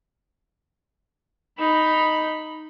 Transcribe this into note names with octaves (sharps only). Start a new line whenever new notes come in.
D#4 B5